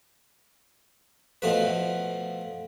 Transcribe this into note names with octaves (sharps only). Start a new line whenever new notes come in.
B2 F3 A3 B4